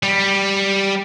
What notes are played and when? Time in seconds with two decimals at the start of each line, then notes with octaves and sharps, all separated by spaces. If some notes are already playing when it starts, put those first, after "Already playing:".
0.03 G3